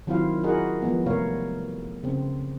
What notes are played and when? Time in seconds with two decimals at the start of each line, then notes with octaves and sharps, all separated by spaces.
0.07 D#3 F#3 C4 E4 F4 F5
0.43 E4 F#4 G#4 A#4 D#5 F#5
0.82 F3 G#3 B3
1.06 C3 G3 A3 A#4 C#5 F5
2.03 C#3 C4